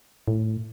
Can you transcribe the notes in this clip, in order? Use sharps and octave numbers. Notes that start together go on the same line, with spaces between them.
A2